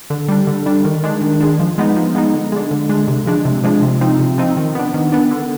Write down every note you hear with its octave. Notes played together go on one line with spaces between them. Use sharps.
D3
G3 D4
D3
G3 D4
D#3
G#3 D4
D#3
G#3 D4
F3
G#3 B3 D#4
F3
G#3 B3 D#4
D3
G#3 D4
D3
G#3 D4
C3
F3 G#3 D4
C3
F3 G#3 D4
C3
F3 C4 D#4
C3
F3 C4 D#4
D#3
B3 D4
D#3
B3 D4
D3